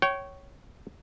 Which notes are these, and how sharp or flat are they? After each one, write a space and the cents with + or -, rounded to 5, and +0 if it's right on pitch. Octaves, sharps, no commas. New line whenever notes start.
C#5 +0 G5 -30